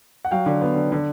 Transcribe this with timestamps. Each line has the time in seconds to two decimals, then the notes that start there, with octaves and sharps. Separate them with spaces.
0.25 F#5
0.31 F#3 F5 G5
0.46 D3
0.61 B3
0.76 D3
0.92 D3